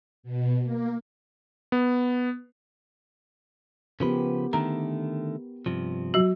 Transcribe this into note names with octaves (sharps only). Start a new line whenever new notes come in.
B2
A#3
B3
C#3 F3 B3 G4 A#4 B4
D3 D#3 A3 A#5
G2 C3 F3
F#3 F#4